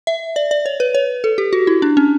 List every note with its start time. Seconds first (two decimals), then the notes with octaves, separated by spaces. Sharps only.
0.07 E5
0.36 D5
0.51 D5
0.66 C#5
0.80 B4
0.95 C#5
1.24 A4
1.38 G4
1.53 F#4
1.67 E4
1.82 D4
1.97 C#4